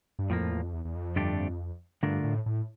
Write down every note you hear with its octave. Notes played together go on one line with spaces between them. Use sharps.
G2
F2 A2 F3 A#3
F2
E2
F2
E2
E2
F2
G2 D3 A3 D4 G4
G2 D3 A3 D4 F4 A#4
A2
A2